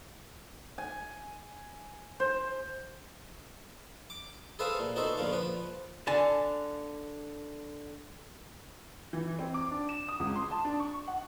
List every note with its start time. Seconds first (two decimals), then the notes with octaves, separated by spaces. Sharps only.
0.78 G#5
2.20 C5
4.10 D6
4.59 G#4 A4 B4 C5 E5 F5
4.79 A#2
4.96 B3 D#4 F#4 A4 C5 E5
5.17 A#1 D3 B3 F5
5.32 F3 B4
6.07 D3 G#5 A5
9.13 E3
9.39 C4
9.54 D6
9.71 D4
9.89 E7
10.08 D#6
10.20 C#2
10.36 C6
10.51 A5
10.65 D4
10.80 C#6
11.08 F#5